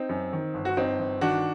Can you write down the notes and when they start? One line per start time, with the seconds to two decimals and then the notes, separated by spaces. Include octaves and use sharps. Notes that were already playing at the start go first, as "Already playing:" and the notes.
Already playing: C4 D#4
0.09 F#2
0.33 D#3
0.54 G1
0.65 F#4
0.77 G1 C4 D#4
0.99 G1
1.21 D#3 D4 F#4